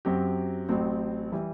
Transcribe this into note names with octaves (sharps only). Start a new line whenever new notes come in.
F#2 F#3 C4 G4
A1 A2 F#3 C4
E3 G3